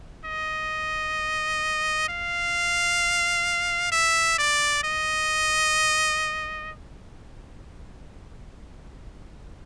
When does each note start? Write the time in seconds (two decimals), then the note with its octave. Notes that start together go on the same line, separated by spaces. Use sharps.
0.25 D#5
2.09 F5
3.92 E5
4.39 D5
4.84 D#5